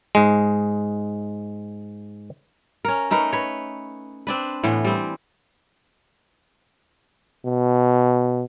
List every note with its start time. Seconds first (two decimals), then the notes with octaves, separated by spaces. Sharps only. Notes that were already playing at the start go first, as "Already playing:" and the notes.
0.15 G#2 G#3
2.85 C#4 A#4
3.11 A3 D#4 A#4 B4
3.33 B4 C#5
4.27 C4 D4 B4
4.64 A2 E3 B3
4.85 G3 C4
7.45 B2